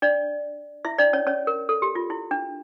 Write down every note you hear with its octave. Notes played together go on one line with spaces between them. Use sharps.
D4 D5
E4 E5
D4 D5
C#4 C#5
C#4 C#5
A#4
A4
G4
F4
E4
D4